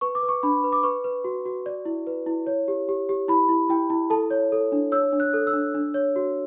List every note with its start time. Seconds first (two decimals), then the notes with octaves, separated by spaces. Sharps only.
0.01 B4 C#6
0.15 D6
0.23 B4
0.28 C#6
0.43 D4 B5
0.64 B4
0.72 D6
0.83 B4 C#6
1.04 B4
1.24 F#4
1.46 F#4
1.66 D5
1.85 E4
2.07 B4
2.26 E4
2.47 C#5
2.68 G4
2.89 G4
3.09 G4
3.28 E4 B5
3.49 E4
3.69 E4 G5
3.90 E4
4.10 A4 A5
4.31 C#5
4.52 A4
4.72 D4
4.92 C#5 E6
5.12 D4
5.20 F#6
5.34 A4
5.47 E6
5.53 D4
5.74 D4
5.94 C#5
6.16 F#4